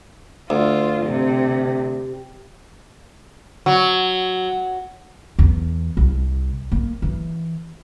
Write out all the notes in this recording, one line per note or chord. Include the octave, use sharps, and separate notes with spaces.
D2 F4
C3 G4
F#3
E2
C2
A#3
E3